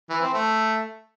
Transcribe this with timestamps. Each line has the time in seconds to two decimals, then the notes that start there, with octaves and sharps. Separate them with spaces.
0.10 E3
0.21 C4
0.33 A3